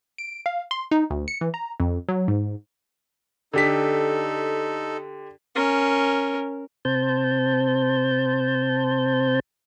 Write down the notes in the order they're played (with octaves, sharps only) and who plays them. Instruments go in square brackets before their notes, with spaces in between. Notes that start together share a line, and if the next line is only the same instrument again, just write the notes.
[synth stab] D7
F5
C6
D#4
D2
C#7
E3
A#5
F2
F#3
G#2
[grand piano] D3 G4 B6 [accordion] D#4 A4
[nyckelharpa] C#4 A#4
[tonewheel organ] C3 C4 C5 A5 G6